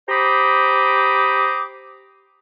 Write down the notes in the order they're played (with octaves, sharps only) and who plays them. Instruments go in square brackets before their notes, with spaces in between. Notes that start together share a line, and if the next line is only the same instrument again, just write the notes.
[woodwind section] G4 C5 A#5 B5 D6 D#6